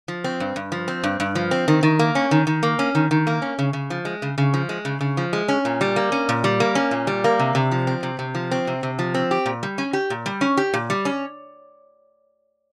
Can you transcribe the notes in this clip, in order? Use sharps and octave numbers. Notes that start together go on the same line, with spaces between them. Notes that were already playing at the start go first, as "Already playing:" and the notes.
F3
C4
G2
G2
F3
C4
G2
G2
F3
C4
D#3
D#3
A#3
C#4
D#3
D#3
A#3
C#4
D#3
D#3
A#3
C#4
C#3
C#3
F3
G#3
C#3
C#3
F3
G#3
C#3
C#3
F3
G#3
C#4
A#2
G3
A#3
C#4
A#2
G3
A#3
C#4
A#2
G3
A#3
C3
C3
F3
C4
C3
C3
F3
C4
C3
C3
F3
C4
G4
A#2
G3
C#4
G4
A#2
G3
C#4
G4
A#2
G3
C#4